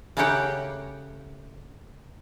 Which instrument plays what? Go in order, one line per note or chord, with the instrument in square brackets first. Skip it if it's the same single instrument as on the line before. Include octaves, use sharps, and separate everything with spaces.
[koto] C#3 A3 A#3 G4 F#5 G5